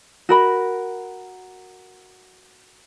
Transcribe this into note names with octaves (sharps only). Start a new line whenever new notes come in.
F#4 A#4 B5